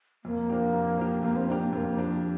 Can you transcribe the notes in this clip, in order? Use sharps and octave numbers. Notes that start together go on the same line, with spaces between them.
F2 A#3
F3 D4 G4
F2
F3 D4 G4
F2 A#3
C4
F3 A#3 D4 G4
A#3
F2 A#3 C4
F3 D4 G4